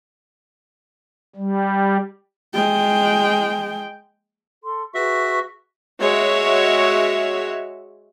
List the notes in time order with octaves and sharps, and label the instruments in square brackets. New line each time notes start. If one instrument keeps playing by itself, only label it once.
[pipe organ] G3
[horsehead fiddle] G#3 G5
[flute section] A4 C6
[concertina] F#4 E5 [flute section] G#4 B4 C#6
[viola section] G#3 F#4 C#5 E5